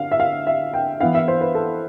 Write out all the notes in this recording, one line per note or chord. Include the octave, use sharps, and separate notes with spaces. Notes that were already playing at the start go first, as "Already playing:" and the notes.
Already playing: D3 F5
E5
F5
E5
G5
E3 B3 E4 F5
E5
C5
B4
A4